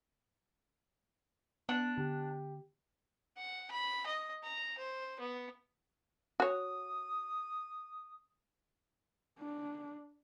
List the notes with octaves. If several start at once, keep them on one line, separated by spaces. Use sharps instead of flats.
B3 D4 F#5 A5
D3 G4
F#5
B5
D#5
A#5
C5
B3
F#4 C#5 D#6
D4